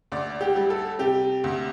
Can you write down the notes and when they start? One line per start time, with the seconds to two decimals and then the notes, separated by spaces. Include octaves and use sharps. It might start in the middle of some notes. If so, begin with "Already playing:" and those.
0.12 D2 D5
0.41 G4
0.56 G3
0.70 A4
0.99 C3 G4
1.44 D2